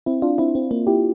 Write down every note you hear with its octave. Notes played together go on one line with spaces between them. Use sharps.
C4 E4
D4 F4
C4 E4
C4
A#3
E4 G4